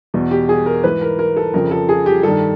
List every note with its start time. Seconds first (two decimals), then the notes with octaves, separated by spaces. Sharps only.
0.14 E2 B2
0.31 G4
0.49 G#4
0.66 A#4
0.84 G#2 E3 B4
1.01 A#4
1.19 A#4
1.36 A4
1.54 F2 C#3 F3 A#4
1.71 A4
1.89 G#4
2.06 G4
2.23 G2 D#3 A4